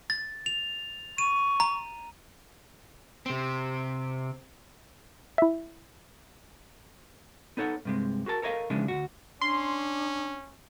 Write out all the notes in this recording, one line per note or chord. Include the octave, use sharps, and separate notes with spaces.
A6
F7
C#6 D#7
A#5
C3 C4
E4 E5
B3 D#4 A4 C#5 F#5
G2 C3 G#3
F#4 G#4 A#4 A5
A4 A#4 C#5 D#5 F5
C#3 E3 F3 G#3 C#4 D4
D2 G#2 F#4
C#4 D4 C6